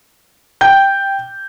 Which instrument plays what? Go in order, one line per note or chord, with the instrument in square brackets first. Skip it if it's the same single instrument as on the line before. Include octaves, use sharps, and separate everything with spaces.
[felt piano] G5 G6